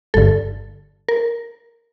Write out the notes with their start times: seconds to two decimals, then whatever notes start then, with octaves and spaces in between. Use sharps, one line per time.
0.14 G1 G2 D3 A4
1.08 A#4